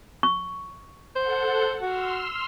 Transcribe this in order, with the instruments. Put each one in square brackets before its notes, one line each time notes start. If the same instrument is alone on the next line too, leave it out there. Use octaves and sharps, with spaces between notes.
[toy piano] C#6
[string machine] A4 F#5 [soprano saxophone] C5
[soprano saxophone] F#4 [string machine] C6 E6 F6